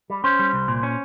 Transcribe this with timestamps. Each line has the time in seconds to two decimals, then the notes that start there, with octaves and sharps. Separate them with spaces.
0.10 G3
0.24 C#4 C5
0.39 G3
0.53 C2
0.68 A#2
0.83 C#4